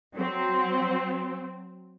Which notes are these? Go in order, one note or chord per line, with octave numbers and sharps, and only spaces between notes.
F#3 C4